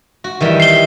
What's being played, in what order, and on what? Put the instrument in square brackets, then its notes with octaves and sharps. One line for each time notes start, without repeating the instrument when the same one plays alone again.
[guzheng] F#4
D#3 E3 G3
[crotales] C7 G7